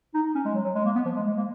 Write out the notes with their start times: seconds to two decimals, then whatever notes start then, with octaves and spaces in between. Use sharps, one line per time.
0.14 D#4
0.35 C#4
0.45 G#3
0.54 F#3
0.65 F#3
0.75 G#3
0.85 A#3
0.95 B3
1.05 F3
1.16 G#3
1.27 G#3
1.37 A#3